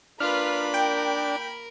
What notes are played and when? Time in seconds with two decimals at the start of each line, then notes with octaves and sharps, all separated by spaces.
0.20 A#3 D4 F4 B4 B5 F6
0.74 A#4 G5